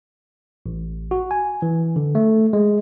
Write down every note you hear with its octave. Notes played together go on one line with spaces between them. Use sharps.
A1
F#4
G#5
E3
D3
A3
G#3